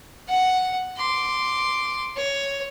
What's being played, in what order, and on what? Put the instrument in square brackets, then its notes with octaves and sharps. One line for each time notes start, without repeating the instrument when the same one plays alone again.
[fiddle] F#5
C6 D6
C#5